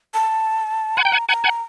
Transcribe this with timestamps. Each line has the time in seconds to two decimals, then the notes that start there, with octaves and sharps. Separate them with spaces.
0.14 A5
0.97 F#5 G#5 C6
1.02 G5 A#5
1.12 F#5 G#5
1.29 F#5 G#5 A#5
1.44 F#5 G#5